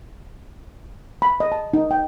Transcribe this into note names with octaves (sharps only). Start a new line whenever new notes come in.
B5
D#5
A5
D#4
G5